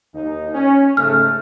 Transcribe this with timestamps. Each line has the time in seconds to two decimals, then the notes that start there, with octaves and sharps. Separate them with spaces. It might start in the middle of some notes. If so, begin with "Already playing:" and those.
0.14 D#2 D#4
0.54 C#4
0.97 G#2 C#3 A3 F6